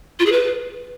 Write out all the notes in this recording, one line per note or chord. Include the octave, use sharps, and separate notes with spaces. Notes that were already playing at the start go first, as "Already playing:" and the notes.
F4
G#4
B4